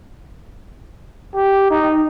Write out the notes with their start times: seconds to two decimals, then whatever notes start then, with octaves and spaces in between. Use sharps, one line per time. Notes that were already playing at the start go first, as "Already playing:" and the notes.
1.35 G4
1.70 D#4